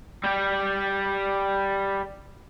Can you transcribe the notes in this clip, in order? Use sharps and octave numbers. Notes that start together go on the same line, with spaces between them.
G3 G4